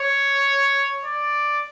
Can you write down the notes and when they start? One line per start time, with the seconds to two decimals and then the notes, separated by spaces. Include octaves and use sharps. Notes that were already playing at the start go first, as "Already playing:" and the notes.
Already playing: C#5
1.05 D5